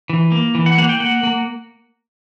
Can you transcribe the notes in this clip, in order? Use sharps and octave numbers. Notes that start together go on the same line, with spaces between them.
E3
A#3
E3
F#5
A#3 F#5
G5
A#3 F#5
A#3